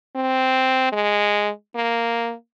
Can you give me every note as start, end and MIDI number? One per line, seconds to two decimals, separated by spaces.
0.16 0.90 60
0.92 1.50 56
1.76 2.33 58